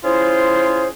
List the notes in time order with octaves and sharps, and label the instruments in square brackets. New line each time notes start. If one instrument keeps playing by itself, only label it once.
[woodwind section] C#4 E4 F4 G#4 C5